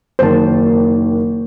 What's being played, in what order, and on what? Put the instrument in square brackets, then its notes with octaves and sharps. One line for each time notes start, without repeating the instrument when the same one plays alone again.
[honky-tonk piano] F#1 D#3 [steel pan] C5 A5